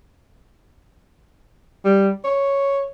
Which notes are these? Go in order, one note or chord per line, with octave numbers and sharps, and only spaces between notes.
G3
C#5